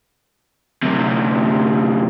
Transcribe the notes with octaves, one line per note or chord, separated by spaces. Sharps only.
F#2 C3